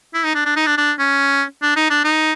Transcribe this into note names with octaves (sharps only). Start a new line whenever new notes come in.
E4
D#4
D4
D4
D#4
D4
D4
C#4
D4
D#4
D4
D#4